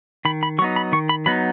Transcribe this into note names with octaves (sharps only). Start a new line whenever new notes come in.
D#3 B5
B5
F#3 B3 D#4 C#6
B5
D#3 C#6
B5
F#3 B3 D#4 B5